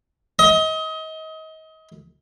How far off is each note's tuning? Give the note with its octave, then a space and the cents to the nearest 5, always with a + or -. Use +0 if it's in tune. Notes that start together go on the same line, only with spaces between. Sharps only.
D#5 +30